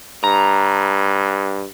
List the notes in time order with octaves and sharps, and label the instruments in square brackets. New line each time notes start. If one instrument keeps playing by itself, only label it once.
[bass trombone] G2 [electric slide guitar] A#5